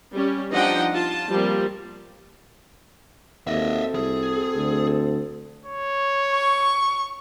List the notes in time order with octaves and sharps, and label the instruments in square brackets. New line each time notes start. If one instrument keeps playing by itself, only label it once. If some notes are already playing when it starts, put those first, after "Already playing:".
[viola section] G3 C#4
F3 D4 D#4 D#5 F#5 G5
F4 A5
F3 G3 A#3 C4
[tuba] D#2 [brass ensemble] C4 F#4 A4 [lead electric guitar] D#5 E5
[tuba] C2 [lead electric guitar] G#4
[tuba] D2
[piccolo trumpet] C#5
[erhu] C#6